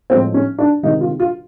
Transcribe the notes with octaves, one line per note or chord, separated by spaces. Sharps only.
A2 F3 G#3 C4
C#4
D4
C3 D#3 G#3 D#4
F4
F4